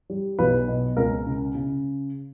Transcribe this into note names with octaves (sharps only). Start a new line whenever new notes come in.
G3
B1 B4
B2
C#2 A#4
C#3
C#3